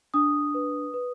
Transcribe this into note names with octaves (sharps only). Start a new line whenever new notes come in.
D4 D#6
B4
B4